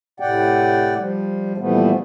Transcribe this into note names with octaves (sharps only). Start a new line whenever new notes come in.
A2 C3 D5 F#5 G5
F3 G3
A#2 E3 F3 G3 A3 B3